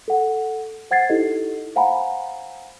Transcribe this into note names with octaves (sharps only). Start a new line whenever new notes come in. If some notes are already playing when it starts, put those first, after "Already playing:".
A4 F#5
C5 F#5 G#6 A6 C7
D#4 E4 G4 A4 D#5
C5 F5 F#5 G#5 A#5 B5